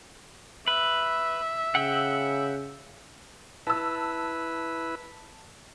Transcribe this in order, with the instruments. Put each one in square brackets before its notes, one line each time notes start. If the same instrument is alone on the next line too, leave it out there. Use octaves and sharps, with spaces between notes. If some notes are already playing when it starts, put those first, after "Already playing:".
[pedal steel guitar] B4 [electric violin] E5
[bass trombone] C#3 [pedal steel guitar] F#5 G5 E6
[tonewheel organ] E4 B4 [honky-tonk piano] A5 E6